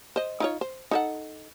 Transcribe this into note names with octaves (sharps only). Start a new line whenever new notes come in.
C5 D#5
D#4 F4 C#5
C5
D#4 A4 F#5